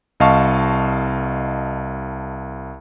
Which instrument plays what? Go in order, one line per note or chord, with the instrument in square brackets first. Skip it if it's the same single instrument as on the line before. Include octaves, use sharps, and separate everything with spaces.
[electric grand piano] C2 D#5 F5 A5 C#6